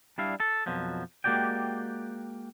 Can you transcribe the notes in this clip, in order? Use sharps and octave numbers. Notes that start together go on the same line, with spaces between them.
G3 D4 E4 F5
A4
F2 B2 F3 F#3
G#3 A#3 F#4 G4 D5 G5